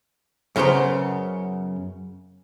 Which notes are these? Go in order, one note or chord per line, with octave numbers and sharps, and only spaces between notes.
F#2 C#3 B3 C5 A#5